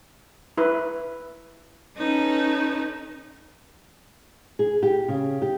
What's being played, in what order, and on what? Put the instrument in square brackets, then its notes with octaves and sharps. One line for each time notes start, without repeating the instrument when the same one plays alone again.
[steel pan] E4 B4
[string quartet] C#4 D#4 A4 B4
[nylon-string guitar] G#4
G4
C#3
G4